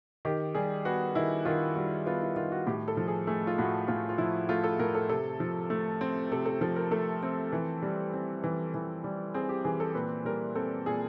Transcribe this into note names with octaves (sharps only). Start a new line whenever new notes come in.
D#3 G4
G3 G#4
B3 F#4
D#3 E4
D#3 F4
G3 F#4
B3 F4
E4
D#3 F4
F#4
A2 G4
A4
F3
G#4
A3 G#4
F4
A2 F#4
A2 F4
F4
F3 E4
A3 F4
A4
A2 A#4
A4
C3 A4
F3
A3
C4
C3 A4
A4
F3 A4
A#4
A3 A4
C4
E3
G3
C4
E3
E3
G3
C4 G#4
G4
E3 G#4
A4
A#2 B4
G3 A#4
C4 A4
A#2 G#4